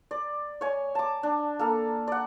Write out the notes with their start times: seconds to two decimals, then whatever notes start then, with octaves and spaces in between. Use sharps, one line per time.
0.11 D5
0.61 C#5 G#5
0.95 A5 D6
1.23 D4
1.59 A#3 A4
2.07 D5 F#5